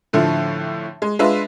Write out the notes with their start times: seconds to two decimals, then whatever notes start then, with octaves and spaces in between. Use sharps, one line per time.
0.13 A2 D3 F3 A3
1.02 G#3
1.19 G#3 D4 F4 B4 E5